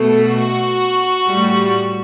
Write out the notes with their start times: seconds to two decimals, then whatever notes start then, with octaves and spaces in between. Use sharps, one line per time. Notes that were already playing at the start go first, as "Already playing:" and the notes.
Already playing: B2 A3
0.24 F#4
1.26 A2 G3